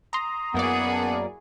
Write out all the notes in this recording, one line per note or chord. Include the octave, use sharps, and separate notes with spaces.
A#5 C6 D#6
F#2 A#3 B3 E4 F#4 G#4 D5
A5